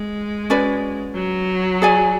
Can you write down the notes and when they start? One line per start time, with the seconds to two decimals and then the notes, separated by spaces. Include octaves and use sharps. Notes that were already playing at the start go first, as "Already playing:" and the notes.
Already playing: G#3
0.50 C#4 F#4 B4 D5
1.15 F#3
1.82 G#4 D5 G#5